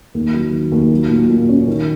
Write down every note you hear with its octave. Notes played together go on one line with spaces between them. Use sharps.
D#2
F#3
D#3
D#2
F#3
A#2
A#2
C#4
D#3